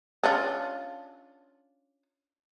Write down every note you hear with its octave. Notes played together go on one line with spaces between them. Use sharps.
C#4 D4 F4